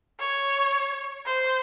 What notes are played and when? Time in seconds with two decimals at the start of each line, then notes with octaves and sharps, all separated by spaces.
0.19 C#5
1.26 C5